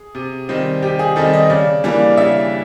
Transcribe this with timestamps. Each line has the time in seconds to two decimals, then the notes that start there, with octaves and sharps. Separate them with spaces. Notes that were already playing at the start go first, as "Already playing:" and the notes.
Already playing: G#4
0.15 C3
0.49 D#3 G3 C4 D#4
0.82 C3 G4
0.99 G#4
1.16 D#3 G3 C4 D#4 A4
1.33 D#5
1.50 C#3 D5
1.84 E3 G3 A#3 D4
2.17 C#3 E5